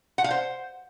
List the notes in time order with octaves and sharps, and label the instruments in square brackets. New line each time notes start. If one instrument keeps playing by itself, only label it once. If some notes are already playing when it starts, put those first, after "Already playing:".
[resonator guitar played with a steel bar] F#5
F5
C5